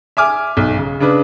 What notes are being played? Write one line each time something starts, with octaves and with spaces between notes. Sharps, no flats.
E5 G#5 D6 F6
B1
C#3
C#3 D4 B4